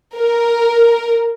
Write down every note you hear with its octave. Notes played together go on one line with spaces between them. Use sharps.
A#4